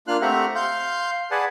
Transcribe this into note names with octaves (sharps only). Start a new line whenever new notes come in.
A#3 D4 F4 F5 F6 F#6
A3 C4 G4 E5 F#5 A#5
F5 C6 G6
G#4 B4 D5 F#5 G#5 A5